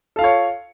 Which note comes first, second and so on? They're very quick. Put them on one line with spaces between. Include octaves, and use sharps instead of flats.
A4 F5 F4 C#5